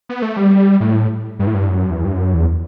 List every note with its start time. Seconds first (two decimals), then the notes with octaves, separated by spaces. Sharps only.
0.09 B3
0.22 A3
0.37 G3
0.81 A2
1.39 G2
1.47 A2
1.54 G2
1.69 F#2
1.90 E2
2.05 G2
2.12 F#2
2.34 E2